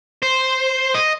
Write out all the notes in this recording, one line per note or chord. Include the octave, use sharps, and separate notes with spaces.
C5
D#5